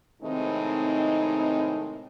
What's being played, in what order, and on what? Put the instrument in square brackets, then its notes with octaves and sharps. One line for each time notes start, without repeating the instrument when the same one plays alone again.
[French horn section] A2 C3 D#3 G#3 C4 D#4